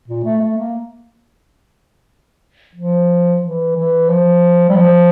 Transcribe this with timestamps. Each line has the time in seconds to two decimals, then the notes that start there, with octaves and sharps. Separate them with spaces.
0.08 A#2
0.24 A3
0.41 A3
0.58 A#3
2.75 F3
3.42 E3
3.76 E3
4.09 F3
4.69 G3
4.76 F3